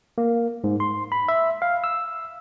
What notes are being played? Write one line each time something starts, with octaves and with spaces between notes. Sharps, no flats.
A#3
G#2
C6
B5
E5
F5
E6